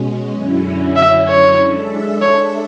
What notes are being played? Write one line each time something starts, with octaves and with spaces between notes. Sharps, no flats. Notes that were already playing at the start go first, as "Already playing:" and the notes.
Already playing: B2 G#3 C#4
F#2 D3 F#3 C#4 E4
E5
C#5
G#3 D4 A4 E5
C#5